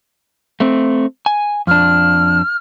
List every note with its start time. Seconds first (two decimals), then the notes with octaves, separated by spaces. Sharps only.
0.60 A3 C4
1.26 G#5
1.67 F2 D4 F6